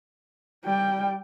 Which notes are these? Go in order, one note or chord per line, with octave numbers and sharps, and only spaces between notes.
G3 G5